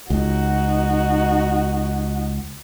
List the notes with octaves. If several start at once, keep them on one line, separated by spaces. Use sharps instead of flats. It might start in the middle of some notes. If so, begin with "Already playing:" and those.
C#2 D#4 F#4